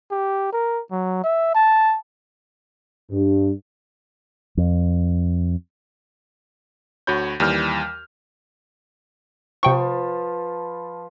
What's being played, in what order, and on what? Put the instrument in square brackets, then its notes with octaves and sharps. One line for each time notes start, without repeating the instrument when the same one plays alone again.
[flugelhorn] G4
A#4
F#3
E5
A5
[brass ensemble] G2
[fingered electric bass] F2
[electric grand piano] D2 F#4 C#5 B5 G6
D#2 E3 G3 F6 G6
[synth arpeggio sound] C3 G5 C#6 [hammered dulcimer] F3 B4